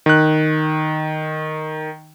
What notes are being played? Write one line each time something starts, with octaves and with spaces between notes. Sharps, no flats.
D#3 F#6